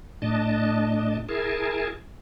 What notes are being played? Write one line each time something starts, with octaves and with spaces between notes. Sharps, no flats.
A2 D4 D#5 A5
E4 G#4 A#4 G#5 A5